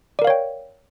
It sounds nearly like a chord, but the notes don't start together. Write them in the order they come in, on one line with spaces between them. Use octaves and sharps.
D5 A#4 F5 C#5 G5